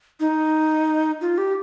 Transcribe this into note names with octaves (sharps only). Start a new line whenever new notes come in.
D#4
F4
G4